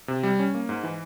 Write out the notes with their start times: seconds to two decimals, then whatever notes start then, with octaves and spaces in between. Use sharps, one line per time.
0.08 C3
0.23 G3
0.39 C#4
0.54 A#3
0.69 G#2
0.83 E3